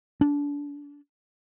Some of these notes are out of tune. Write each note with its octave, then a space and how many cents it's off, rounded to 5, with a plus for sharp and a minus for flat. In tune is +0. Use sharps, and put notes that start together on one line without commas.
D4 -30